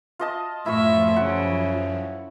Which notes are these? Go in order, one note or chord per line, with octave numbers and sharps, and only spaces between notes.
F4 D#5 A5
F#2 A2 F3 E4 F4 E5 C#6
C#3 F#5